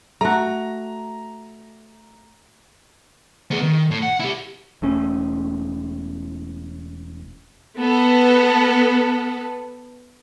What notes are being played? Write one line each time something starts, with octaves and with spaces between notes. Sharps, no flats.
A3 F#4 A#5
B3 G#4
D#3
A2
F#5
E4 G4
E1 A3 C#4
B3 A4